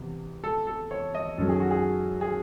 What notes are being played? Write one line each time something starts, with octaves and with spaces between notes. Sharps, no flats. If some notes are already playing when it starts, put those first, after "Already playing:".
Already playing: E2 C3
A4
A4
C#5
D#5
F#2 D#3 F#3 A4
G#4
F#4
G#4
G#4